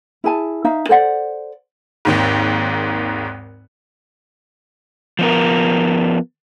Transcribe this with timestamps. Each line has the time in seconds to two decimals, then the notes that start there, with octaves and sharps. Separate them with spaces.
0.24 E4 G#4 G#5 A5
0.65 D#4 E5 F5
0.89 A4 C5 D5 F#5
2.05 G#1 D#2 G#2
5.19 F3 B3 A#4